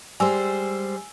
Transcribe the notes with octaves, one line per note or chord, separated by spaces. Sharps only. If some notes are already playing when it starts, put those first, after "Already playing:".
G3 G#3 C5 G#5 E6